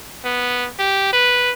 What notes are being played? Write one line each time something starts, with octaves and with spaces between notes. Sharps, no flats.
B3
G4
B4